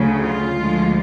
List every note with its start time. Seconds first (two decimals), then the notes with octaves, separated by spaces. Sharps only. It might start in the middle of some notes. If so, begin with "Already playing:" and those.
Already playing: D2 C#3 F#3
0.21 F4
0.55 D2 D3 F3 G#3